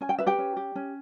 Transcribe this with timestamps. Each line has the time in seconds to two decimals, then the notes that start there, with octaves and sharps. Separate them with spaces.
0.01 C#4 G#5
0.09 G5
0.18 B4 E5
0.27 G4 G5
0.38 C#4
0.57 G4
0.76 C#4